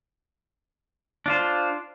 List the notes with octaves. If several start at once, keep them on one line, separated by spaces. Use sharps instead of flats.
D4 F4 C5